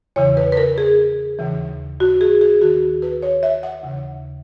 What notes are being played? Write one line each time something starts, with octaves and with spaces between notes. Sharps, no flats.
E2 C#3 E3 C#5
B4
B4
A#4
G#4
D#2 C#3 E3
F#4
G#4
G#4
D#2 D#3 F#4
B4
C#5
E5
F#5
D#2 C#3 E3